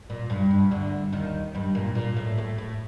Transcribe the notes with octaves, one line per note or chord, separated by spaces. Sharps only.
A#2
G2
G2
D2 D3
D#2 D#3
G2 G3
A#2 A#3
A#2 A#3
A2 A3
A2 A3
A2 A3